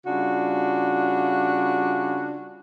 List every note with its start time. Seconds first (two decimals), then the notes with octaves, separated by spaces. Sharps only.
0.06 C#3 G3 D4 F4 F#4